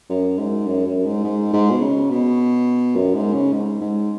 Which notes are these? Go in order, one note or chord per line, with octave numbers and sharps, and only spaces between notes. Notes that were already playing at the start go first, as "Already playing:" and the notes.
F#2
G#2
F#2
F#2
G#2
G#2
G#2
B2
C#3
B2
F#2
G#2
C#3
G#2
G#2